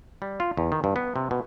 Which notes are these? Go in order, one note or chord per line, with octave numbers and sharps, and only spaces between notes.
G3
F4
E2
D#3
G2
B3
C3
B2